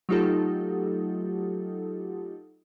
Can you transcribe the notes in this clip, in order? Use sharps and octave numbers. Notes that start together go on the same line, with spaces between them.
F#3 A3 D#4 F4 G4 A4